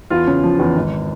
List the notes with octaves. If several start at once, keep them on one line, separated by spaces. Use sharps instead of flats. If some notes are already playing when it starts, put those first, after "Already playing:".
E2 F4
C#3
F3
E2
G#1